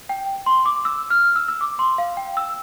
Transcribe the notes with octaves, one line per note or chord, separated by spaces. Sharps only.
G5
C6
D6
E6
F6
E6
E6
D6
C6
F5
G5
E6